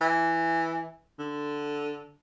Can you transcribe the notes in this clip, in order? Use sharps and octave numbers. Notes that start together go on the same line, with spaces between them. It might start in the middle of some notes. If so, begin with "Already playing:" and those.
E3
D3